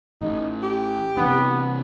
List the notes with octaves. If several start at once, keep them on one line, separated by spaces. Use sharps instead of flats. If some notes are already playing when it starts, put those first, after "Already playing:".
A1 D#4
G4
C3 E3 B3 D4